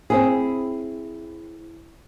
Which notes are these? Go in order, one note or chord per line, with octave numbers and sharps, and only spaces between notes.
C4 E4 G#4